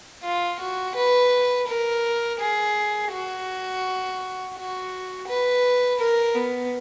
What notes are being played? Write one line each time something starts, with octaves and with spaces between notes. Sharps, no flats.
F4
F#4
B4
A#4
G#4
F#4
F#4
B4
A#4
B3